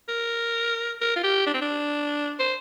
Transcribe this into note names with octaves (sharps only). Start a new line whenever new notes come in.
A#4
A#4
F4
G4
D4
C4
D4
C5